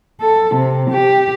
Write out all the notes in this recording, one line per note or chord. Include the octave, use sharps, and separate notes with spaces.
A4
C3
G4